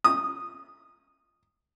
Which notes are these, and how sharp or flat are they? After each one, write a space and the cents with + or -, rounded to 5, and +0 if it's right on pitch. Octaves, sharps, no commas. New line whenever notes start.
D#6 -10